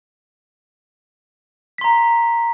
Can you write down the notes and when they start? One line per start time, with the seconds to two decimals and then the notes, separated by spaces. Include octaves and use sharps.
1.78 B6
1.81 C6
1.84 A#5